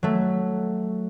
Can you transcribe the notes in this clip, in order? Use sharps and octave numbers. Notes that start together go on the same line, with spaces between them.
F#3 A3